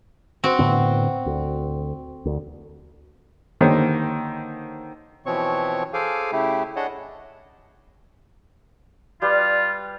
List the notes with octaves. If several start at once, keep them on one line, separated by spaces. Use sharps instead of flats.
C4 F#4
A2 D3 B3
D2
D2
D3 D#3 A#3 G4 C5 C#5
B2 E3 F3 C4 C#5 C#6
G#4 A4 C5 F5 G#5 D6
C#3 A3 E4 G4
D4 G#4 C#5 D#5 F#5 A5
G3 F4 G4 B4